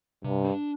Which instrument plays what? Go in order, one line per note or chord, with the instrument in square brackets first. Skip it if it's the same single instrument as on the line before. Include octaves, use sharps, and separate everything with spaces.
[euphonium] G2 [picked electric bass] C3
[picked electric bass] D4